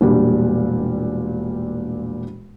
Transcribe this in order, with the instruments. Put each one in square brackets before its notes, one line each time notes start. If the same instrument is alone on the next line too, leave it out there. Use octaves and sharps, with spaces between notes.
[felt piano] E1 A#2 G3 D4